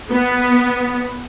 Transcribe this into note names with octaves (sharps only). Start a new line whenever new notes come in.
B3